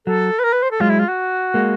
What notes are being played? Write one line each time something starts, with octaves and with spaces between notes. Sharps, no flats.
F#3 A4
B4
A#4
B4
C5
A4
F#3 G#3 F4
E4
F4
F#4
G#3 A#3